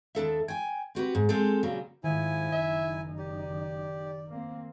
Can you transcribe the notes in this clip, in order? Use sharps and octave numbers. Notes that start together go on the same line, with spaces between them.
D#2 D4 A4 E5
G5 G#5
C4 F#4 G4 B4
G#2
G#3 C4 G4 A4
A#2 C#3 F#3 G3
G#2 D#3 F3 G#3 E4 G#5
F#1 D#4 E5
G4 D5
D#3
A#3 C4